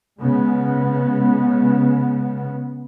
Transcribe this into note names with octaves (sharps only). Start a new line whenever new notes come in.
C#3 G#3 B3